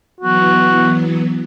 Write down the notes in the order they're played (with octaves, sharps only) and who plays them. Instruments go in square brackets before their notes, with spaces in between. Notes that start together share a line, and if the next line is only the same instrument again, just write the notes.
[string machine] E3 F#3 B3 [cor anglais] F#4